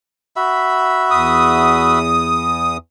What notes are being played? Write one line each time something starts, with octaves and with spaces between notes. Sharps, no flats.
F#4 E5 B5
E2 D#6